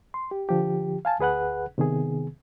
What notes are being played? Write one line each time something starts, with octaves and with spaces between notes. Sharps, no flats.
C6
G4
D3 F3 G4
F5 G#5 A5
D2 G#4 B4 F#5 F#6
C3 D#3 B3 G#4